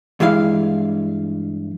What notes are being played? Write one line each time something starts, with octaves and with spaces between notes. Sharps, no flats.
G2 E3 G#3 E4 F5